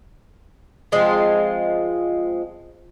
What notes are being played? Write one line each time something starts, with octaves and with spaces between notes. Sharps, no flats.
F3 G#3 C4 F4